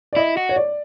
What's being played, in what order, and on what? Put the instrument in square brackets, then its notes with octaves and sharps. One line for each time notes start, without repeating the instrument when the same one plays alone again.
[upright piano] D5
[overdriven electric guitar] E4 [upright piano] D#5
[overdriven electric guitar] F#4
[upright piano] C#5
D5